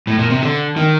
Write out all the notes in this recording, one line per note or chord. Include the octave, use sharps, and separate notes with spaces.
A2
A#2
C3
D3
D#3